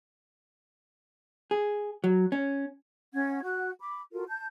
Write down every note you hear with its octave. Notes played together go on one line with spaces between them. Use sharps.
G#4
F#3
C#4
C#4 F#5 G#6
F#4 F#5 F#6
B5 D6
F4 F#4 A4 A#4
A5 G6